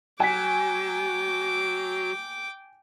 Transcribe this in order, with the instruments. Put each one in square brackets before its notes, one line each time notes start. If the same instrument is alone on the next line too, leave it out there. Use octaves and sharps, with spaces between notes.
[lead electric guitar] F#3 [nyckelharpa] G5 D6 [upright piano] G#5 B6